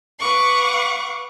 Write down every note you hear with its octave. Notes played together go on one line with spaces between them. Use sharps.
B4 F5 F#5 C#6 D6